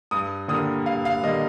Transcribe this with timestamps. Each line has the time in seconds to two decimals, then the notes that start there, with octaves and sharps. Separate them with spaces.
0.11 G2 D#6
0.48 D3 G3 A#3 D#6
0.86 G2 F5
1.05 F5
1.23 D3 G3 A#3 D#5